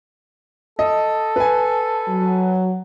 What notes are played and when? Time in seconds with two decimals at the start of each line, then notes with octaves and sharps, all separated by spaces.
0.79 A4 D#5
1.36 B4 G#5
2.08 F#3